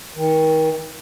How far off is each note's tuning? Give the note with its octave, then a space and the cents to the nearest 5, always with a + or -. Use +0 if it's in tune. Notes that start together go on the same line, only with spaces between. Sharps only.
D#3 +30